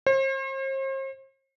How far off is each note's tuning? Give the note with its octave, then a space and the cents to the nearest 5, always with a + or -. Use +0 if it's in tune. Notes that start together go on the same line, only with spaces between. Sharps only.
C5 +40